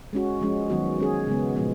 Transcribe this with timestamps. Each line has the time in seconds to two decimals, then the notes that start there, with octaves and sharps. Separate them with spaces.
0.13 G#3 C#4 F#4
0.41 F3 G#3 C#4
0.70 D#3 F#3 B3 F#4
0.98 G#3 C#4 G#4
1.27 C#3 G#3 B3
1.55 A#2 F3 G#3 B3